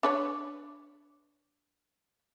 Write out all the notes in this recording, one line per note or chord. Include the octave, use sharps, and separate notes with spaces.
D4 B4 C#5